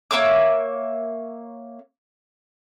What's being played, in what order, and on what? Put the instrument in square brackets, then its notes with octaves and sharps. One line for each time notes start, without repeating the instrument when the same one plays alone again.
[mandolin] A#3 C#5 E5 D6